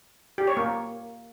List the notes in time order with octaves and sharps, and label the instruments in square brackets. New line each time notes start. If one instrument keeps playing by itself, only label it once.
[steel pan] G4
C#5
A#3